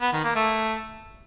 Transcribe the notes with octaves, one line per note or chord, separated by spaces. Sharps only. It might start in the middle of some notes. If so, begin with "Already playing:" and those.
B3
D#3
A#3
A3